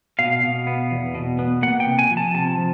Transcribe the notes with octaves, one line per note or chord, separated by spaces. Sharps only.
B2 F5
B2
B3
E2
B2
B3
A#3 F#5
G5
C3
G#5
F3
A5
C3 A5
F3